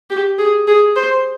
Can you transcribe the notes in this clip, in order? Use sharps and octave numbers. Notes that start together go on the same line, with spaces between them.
G4
G#4
G#4
C5